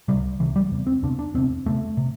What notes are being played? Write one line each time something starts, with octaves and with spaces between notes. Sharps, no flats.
C2 C3 G3
C2 C3 E3
G3
E2 C3
C4
E2 C3 D4
D4
E2 C3 C4
E2 C3 A3
C3